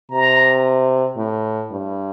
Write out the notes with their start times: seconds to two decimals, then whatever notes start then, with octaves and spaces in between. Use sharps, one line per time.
0.11 C3 A#5
1.17 A2
1.71 G2